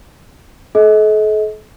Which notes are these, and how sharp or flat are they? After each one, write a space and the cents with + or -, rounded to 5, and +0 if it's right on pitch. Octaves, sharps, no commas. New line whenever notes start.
A4 -40 D#5 +35